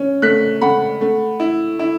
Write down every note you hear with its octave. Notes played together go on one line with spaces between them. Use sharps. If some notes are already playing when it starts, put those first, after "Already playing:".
Already playing: C#4
A3 F#6 B6
A3 F#5 B5
A3
E4
E4